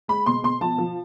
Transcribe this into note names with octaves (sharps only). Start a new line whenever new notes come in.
G#3 B5
B2 C6
B2 C6
F3 A5
F3